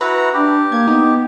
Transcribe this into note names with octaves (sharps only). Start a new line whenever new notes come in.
E4 F#4 B4 A#5
D4 G4
A#3 G#6
B3 D#4